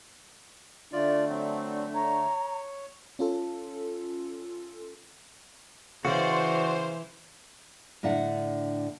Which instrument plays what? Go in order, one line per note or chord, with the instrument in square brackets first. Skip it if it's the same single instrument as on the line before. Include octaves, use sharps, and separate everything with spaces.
[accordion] D3 A3 [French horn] D4 [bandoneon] F4 D5
[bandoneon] F#3 C4
[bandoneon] C#5 [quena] A#5
[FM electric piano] C#4 F4 A4
[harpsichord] C#3 [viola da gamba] E3 [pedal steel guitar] F#4 D5 [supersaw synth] C5
[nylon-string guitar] A2 D3 D4 E5 F#5